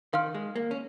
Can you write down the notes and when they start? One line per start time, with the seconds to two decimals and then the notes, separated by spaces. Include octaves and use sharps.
0.13 D#3 A#4 F5 C6 F6
0.34 G#3
0.56 A#3
0.71 C#4